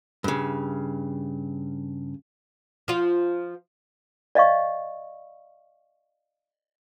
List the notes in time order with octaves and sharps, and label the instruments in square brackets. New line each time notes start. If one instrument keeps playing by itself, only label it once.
[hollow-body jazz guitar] G2 C#3
[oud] F3 F4
[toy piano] D5 D#5 F5 C#6